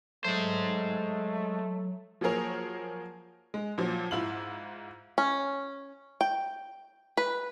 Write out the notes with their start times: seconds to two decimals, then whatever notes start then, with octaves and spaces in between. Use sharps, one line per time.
0.25 F#3 G#3 A3 C5
2.21 F3 F#3 A#3 G#4 A#4 C#5
3.54 G#3
3.78 A#2 F3 F#3
4.11 G#2 E4 F4 F#7
5.18 C#4
6.21 G5
7.17 B4